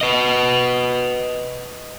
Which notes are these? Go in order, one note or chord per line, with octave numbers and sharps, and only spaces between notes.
B4 D#5